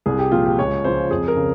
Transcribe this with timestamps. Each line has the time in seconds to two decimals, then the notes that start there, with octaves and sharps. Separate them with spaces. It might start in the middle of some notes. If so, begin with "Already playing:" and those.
0.06 C2 G#4
0.19 G4
0.32 A#2 F3 F4
0.46 G4
0.59 C#2 C#5
0.84 C#3 F3 C5
1.10 F2 G#4
1.28 A#4
1.37 C#3